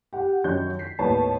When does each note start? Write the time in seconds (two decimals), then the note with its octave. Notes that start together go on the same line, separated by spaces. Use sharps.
0.13 G4 F#5
0.44 F#2 D#3 F#3 C#5 G6
0.79 B6 C7
0.99 D#2 A2 B3 C#5 A5